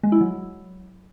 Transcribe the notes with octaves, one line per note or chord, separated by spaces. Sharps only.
G#3
E4
F#3